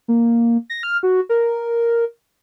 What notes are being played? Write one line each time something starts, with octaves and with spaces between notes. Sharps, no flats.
A#3
A#6
F6
F#4
A#4